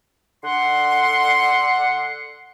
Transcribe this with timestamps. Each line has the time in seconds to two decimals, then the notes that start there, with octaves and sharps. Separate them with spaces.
0.44 D3 F#5 C6